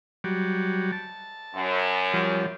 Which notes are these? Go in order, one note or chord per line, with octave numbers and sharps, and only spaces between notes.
F#3 G3
A5
F#2
F3 G3